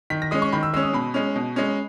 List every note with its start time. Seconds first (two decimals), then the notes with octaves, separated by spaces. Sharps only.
0.10 D#3 B6
0.22 A#6
0.31 G#3 C#4 D#6
0.42 C#6
0.52 D#3 B5
0.63 E6
0.74 G#3 C#4 E6
0.83 D#6
0.93 B2 B5
1.14 G#3 C#4
1.36 B2
1.56 G#3 C#4